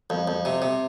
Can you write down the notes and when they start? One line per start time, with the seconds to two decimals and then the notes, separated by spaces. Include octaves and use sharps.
0.10 F2
0.28 F2
0.45 C3
0.62 C3